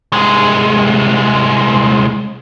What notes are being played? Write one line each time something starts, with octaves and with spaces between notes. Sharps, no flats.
C2 G#3